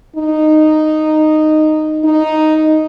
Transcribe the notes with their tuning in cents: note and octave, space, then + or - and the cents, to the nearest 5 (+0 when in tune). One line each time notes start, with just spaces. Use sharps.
D#4 -10
D#4 +0